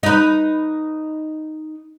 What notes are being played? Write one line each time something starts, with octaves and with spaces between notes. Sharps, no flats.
D#4 B4